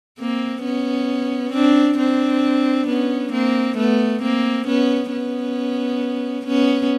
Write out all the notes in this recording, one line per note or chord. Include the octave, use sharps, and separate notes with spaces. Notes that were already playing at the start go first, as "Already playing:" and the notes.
A#3 C4
B3 C#4
C4 D4
C4 D4
B3 C#4
A#3 C4
A3 B3
A#3 C4
B3 C#4
B3 C#4
B3 C#4